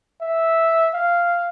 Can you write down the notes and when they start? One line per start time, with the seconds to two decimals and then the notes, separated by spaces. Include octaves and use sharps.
0.21 E5
0.93 F5